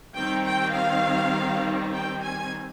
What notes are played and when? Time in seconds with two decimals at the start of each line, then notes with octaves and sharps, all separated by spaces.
0.15 D#3 G3 C4 G5
0.44 G5
0.74 F5
1.93 G5
2.22 G#5